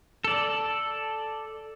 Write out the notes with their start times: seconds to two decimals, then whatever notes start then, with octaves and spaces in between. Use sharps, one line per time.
0.24 A4 D5